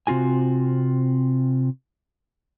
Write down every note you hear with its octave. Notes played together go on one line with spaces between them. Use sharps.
C3 C4 F4 F#4 G#5